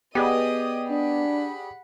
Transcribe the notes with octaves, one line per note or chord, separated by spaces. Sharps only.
B3 G4 G#4 D5 D#5 D#6
D4 F#5 B5